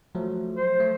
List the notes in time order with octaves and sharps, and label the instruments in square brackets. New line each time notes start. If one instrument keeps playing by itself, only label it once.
[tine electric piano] F3 F#3 A3
[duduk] C5
[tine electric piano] A3